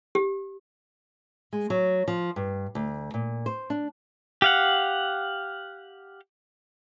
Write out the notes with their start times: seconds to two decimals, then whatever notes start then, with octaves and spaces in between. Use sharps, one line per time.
0.15 G4
1.53 G#3
1.70 F#3
2.08 F3
2.36 G2
2.75 D2
3.14 A#2
3.46 C5
3.70 D4
4.42 G4 F5 F#5